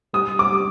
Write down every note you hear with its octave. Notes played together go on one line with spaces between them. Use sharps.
G3 D#6
D6
G3